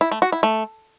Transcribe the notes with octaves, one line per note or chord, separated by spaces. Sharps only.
E4
A3
F#4
E4
A3